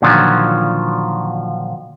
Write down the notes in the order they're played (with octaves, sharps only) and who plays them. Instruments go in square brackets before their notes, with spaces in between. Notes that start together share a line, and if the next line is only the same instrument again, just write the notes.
[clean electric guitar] A#2 D3 D#3 F3 F#3